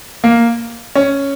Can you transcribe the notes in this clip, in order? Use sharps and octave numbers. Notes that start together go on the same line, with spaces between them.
A#3
C#4